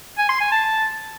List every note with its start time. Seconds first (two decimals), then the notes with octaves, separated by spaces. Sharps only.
0.18 G#5
0.29 C6
0.41 G#5
0.52 A5